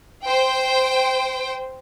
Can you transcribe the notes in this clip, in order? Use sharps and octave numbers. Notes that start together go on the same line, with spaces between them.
C5 G5